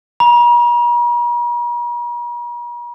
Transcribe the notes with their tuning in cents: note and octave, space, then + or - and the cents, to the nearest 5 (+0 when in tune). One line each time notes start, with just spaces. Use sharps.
A#5 +45